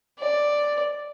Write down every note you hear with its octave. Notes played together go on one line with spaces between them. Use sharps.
D5